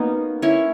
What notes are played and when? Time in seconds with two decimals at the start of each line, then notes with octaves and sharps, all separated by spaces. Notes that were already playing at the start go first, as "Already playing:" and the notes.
Already playing: A#3 B3 C#4 D#4 F#4
0.42 C#4 E4